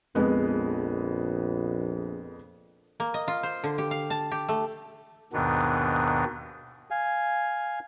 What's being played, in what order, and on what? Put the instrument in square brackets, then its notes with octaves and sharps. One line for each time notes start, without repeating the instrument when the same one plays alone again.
[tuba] A#1 [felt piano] F2 G#3 B3
[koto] A#3
D#5
F4
C5
D3
G4
F5
A5
G4
A3
[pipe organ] D#2 G#2 B2 D#3 B3 D4
[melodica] F5 G#5